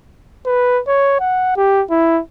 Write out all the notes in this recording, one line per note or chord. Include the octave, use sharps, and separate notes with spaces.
B4
C#5
F#5
G4
E4